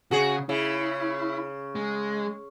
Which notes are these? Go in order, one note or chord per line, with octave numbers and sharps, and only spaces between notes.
C#3 F#4 G#4 C#5
C#3 E4
G#3